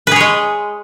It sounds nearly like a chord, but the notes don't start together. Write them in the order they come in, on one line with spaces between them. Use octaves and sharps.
B4 G#4 C#5 G#3